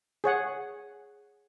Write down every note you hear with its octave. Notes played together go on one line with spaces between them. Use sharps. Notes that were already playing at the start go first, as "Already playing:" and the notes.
G#4 C#5 F#5